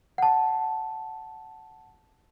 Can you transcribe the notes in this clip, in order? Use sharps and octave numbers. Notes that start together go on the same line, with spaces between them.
F#5 A5